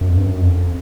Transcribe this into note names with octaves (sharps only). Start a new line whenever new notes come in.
F#2
F2
G2
F#2
F2